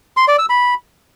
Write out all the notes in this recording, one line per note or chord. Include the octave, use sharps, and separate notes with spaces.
C6
D5
E6
B5